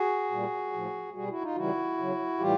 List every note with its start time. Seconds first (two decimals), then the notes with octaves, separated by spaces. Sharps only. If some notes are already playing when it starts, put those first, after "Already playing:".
Already playing: F#4 G#4
0.31 A#2 G3
0.73 A2 F3
1.13 B2 G3 F#4 G#4
1.28 E4 F#4
1.41 D#4 F4
1.55 C#3 E3 G3 E4 F#4
1.98 C#3 F#3
2.39 A2 E3 G3 F4 G4